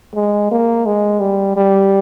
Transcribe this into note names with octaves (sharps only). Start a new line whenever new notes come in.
G#3
A#3
G#3
G3
G3